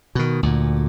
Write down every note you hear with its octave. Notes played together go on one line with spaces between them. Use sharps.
B2 D#3
D2 A#2